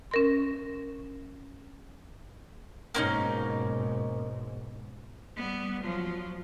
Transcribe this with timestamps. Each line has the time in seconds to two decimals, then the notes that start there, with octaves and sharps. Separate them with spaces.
0.11 C#4 A#4 C6
2.94 G#2 B2 A#3 C#4 D#4
5.36 G3 B3
5.82 F3 F#3